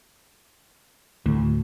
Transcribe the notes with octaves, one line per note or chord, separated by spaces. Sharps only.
D2 A2